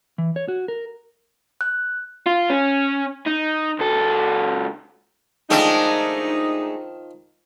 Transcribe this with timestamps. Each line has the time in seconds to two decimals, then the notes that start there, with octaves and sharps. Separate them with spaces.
0.18 E3
0.36 C#5
0.48 F#4
0.68 A#4
1.61 F#6
2.26 F4
2.50 C#4
3.26 D#4
3.79 C#2 A4
5.50 D#3 F3 G#3 A3 D4 D#4